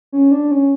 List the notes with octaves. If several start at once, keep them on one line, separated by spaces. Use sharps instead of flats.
C#4
D4
C#4